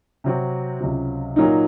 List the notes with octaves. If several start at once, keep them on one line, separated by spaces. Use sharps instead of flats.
C3 F#3 C4 F#4
C#2 C3 F#3
A#2 F#3 A#3 D#4